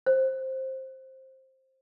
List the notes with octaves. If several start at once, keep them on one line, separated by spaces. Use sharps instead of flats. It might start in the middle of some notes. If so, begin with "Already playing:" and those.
C5